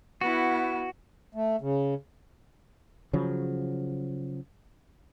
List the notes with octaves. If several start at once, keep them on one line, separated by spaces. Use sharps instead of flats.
B3 E4 F#4
A3
C#3
C#3 F3 F#3